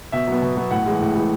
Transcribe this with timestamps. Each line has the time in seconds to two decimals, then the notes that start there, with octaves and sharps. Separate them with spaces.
0.12 B2 E5
0.27 F#3 B3
0.42 B2
0.57 F#3 B3
0.71 A2 F#5
0.86 E3 G#3
1.01 A2
1.15 E3 G#3